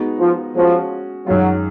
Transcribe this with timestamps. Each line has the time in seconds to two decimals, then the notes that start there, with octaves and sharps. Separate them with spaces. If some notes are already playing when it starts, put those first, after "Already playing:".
Already playing: G#3 B3 D#4 F#4
0.19 F3
0.55 F3 G#3 C#4 F#4
1.27 F#2 D#3 F#3 G#3 C#4 F4